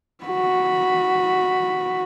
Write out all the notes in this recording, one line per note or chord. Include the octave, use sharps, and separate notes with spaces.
F#4 B5